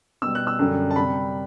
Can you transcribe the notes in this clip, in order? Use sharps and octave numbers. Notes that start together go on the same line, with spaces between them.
B2 G3 E6
F#6
E6
F#2 D3 G3
A5
C3 G3 B5